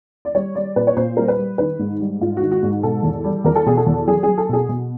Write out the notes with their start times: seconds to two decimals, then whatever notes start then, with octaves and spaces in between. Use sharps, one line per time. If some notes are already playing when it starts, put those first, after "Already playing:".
0.25 D5
0.35 G3 C#5
0.55 G3 D5
0.76 A#2 B4
0.87 C#5
0.97 A#2 C5
1.17 G3 A#4
1.28 B4
1.38 G3
1.58 D#3 B4
1.79 G#2
2.00 G3
2.21 G#2 F4
2.37 D#3 F#4
2.51 F#4
2.63 G#2
2.83 B2 A4
3.03 E2
3.24 G3
3.44 E2 A#4
3.55 A4
3.66 B2 G#4
3.77 A4
3.86 E2
4.07 F#3 G#4
4.23 F#3 G#4
4.38 A4
4.49 B2 G#4
4.69 B2